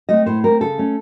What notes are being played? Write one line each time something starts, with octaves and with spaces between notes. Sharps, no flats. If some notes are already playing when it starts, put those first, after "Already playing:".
A3 C4 D#5
A2 C5
A3 C4 A#4
C#3 A4
A3 C#4